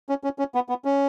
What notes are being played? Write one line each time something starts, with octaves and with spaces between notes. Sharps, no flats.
C#4
C#4
C#4
B3
B3
C#4